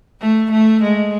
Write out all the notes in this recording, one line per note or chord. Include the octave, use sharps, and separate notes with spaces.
A3
A3
G#3